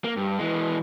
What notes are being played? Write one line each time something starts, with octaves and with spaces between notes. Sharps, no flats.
A#3
G2
E3 G#3